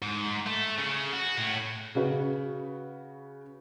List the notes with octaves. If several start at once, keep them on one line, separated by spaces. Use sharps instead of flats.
G#2
A3
C#3
F#4
A2
C#3 F#4 B4